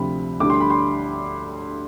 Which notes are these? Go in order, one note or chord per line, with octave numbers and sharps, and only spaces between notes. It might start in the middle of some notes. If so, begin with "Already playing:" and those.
Already playing: D2 C3 F3 B5
D2 D3 G3 D6
C6
B5
C6